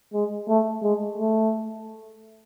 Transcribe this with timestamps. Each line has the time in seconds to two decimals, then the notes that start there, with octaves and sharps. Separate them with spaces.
0.13 G#3
0.48 A3
0.83 G#3
1.18 A3